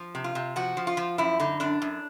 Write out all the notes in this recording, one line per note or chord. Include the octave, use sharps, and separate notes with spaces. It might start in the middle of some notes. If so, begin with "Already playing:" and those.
Already playing: F3
C3
F4
C3
F3 F#4
F3
F4
F3
F#2 E4
D3 D#4
F#2 D4
F#2